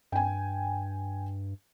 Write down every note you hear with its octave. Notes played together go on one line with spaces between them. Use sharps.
G2 G5 G#5